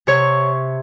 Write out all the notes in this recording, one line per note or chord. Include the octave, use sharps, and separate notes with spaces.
C3 C#5